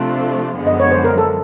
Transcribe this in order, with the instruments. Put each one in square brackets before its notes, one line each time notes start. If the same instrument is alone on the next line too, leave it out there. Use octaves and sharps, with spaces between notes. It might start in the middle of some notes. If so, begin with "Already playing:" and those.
Already playing: [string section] C3 F3 A3 D4 F4
F#2 D3 F3 G#3 B3
[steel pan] D#5
C#5
C5
A#4
A4